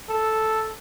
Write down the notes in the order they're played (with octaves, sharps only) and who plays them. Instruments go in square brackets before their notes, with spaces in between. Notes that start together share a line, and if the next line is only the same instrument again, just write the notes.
[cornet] A4